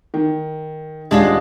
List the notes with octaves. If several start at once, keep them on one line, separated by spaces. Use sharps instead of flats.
D#3
D#1 G#3 D4 F4